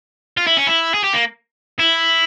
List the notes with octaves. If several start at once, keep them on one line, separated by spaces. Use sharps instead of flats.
F4
E4
C#4
E4
G#4
G4
A#3
E4